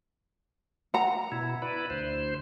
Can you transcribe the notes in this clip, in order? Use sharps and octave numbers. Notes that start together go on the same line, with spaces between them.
F#5 A#5
B2 E4
E4 B4 D5
D2 C5